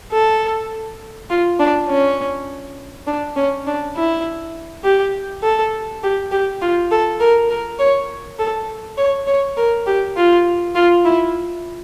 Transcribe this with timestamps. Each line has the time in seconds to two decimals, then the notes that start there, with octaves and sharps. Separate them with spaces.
0.12 A4
1.30 F4
1.59 D4
1.88 C#4
3.07 D4
3.36 C#4
3.67 D4
3.96 E4
4.84 G4
5.43 A4
6.03 G4
6.32 G4
6.62 F4
6.91 A4
7.20 A#4
7.50 A#4
7.79 C#5
8.39 A4
8.97 C#5
9.27 C#5
9.57 A#4
9.87 G4
10.17 F4
10.75 F4
11.05 E4